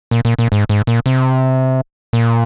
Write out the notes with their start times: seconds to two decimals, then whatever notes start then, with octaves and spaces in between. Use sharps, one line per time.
0.11 A#2
0.25 A#2
0.39 A#2
0.52 G#2
0.69 G#2
0.87 A#2
1.06 C3
2.13 A#2